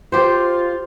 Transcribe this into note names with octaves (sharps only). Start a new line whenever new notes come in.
F4 G4 C5